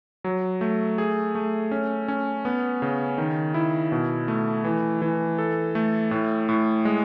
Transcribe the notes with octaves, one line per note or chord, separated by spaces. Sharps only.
F#3
A3
G#4
A3
C#4
C#4
B3
C#3
D#3
E4
B2
A3
E3
E3
A4
A3
A2
A2
G#3